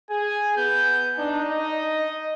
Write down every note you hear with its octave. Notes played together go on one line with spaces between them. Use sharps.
G#4 G#5
B3 G6
D4 D#4
D#5